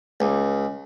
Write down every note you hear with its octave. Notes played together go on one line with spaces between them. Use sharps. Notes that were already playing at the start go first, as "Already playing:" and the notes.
C#2